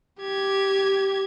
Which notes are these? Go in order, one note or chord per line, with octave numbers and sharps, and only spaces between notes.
G4 G#6